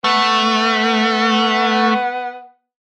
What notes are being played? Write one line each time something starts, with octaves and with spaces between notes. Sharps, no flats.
A3 B3